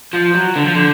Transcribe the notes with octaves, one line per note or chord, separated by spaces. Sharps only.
F3
F#3
D3
F3
D3